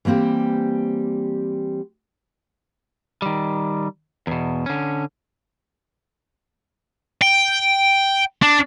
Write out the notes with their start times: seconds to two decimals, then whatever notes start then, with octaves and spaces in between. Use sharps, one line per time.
0.05 E3 G3 A#3 C4 G4
3.22 D#3 G3
4.27 E2 B2
4.66 D3 C#4
7.22 G5
8.43 D4